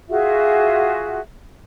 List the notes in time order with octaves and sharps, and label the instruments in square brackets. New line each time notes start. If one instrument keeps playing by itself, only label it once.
[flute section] F4 F#4 G#4 E5